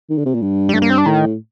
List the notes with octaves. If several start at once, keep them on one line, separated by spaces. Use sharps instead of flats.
D#3
D3
C3
A#2
G2
G3
G2 A3
A#3
C4
D4
A2 D#3